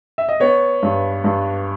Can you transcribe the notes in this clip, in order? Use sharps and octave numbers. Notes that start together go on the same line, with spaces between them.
E5
D#5
B3 C#5
G2
G2